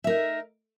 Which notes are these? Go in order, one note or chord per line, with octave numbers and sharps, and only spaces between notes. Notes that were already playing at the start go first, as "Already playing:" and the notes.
D#4 A#4 E5